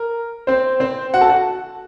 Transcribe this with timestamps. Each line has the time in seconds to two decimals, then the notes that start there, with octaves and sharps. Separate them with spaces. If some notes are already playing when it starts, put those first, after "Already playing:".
Already playing: A#4
0.47 C4 C5
0.80 C4 C5
1.14 F#4 F#5
1.21 A4 A5
1.29 F#4 F#5